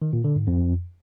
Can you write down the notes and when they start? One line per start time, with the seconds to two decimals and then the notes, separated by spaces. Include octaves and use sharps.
0.02 D#3
0.13 A#2
0.24 D3
0.36 G#2
0.47 F2